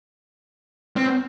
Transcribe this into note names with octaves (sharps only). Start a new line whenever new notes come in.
C4